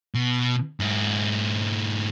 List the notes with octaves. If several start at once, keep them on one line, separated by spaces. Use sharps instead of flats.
B2
G#2 E4